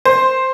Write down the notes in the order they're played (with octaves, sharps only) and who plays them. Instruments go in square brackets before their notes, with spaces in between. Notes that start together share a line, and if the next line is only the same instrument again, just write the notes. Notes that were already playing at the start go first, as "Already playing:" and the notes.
[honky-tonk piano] C5